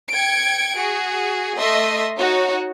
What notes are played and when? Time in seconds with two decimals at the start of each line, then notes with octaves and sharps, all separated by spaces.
0.12 G5 G#6 C#7 D7
0.77 F#4 G#4
1.58 A3 D#5 E5 C6 D#6
2.16 D#4 F#4 C#5